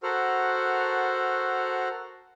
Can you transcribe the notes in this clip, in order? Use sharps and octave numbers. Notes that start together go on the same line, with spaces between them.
F#4 A4 A#4 C5 F#5 F6